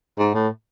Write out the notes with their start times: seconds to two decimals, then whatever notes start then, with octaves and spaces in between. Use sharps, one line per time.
0.19 G#2
0.34 A2